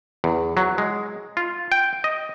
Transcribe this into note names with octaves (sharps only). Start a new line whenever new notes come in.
E2
F#3
G#3
F4
G5
D#5